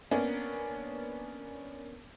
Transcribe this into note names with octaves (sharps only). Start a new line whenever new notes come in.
A#3 B3 C#4 D4